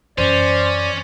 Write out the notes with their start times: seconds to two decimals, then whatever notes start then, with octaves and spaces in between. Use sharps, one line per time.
0.18 F#2 E3 C#4 C5 D5